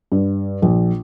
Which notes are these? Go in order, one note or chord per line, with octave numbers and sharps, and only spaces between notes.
G2
A#1